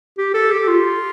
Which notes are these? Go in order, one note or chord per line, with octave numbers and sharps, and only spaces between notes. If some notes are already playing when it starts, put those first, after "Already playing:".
G4
A4
G4
F4